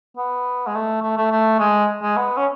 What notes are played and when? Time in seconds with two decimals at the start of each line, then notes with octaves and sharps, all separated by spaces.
0.17 B3
0.67 G#3
0.75 A3
1.02 A3
1.18 A3
1.31 A3
1.59 G#3
2.02 G#3
2.17 B3
2.37 C#4